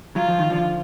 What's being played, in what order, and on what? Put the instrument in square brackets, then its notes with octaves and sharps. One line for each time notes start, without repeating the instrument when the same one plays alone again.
[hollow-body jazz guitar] F#3 [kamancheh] F4
[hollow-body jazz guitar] F3
D#3
D3 F3